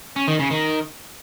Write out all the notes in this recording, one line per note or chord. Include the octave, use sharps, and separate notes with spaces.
C#4
D#3
C#3
D#3